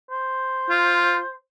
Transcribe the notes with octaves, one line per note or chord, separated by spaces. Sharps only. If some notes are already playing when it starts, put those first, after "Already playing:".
C5
F4